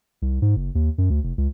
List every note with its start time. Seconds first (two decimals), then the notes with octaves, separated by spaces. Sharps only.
0.22 C2
0.42 G#2
0.56 F#1
0.75 D#2
0.98 F#2
1.10 D2
1.24 F1
1.38 C#2